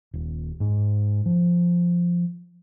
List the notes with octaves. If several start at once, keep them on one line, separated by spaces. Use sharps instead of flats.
D#1
G#2
F3